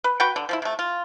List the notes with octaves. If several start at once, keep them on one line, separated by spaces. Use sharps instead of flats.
B4
F#4 B4 F#5 G5
D3
F3 C4 E4
C3 A3
F4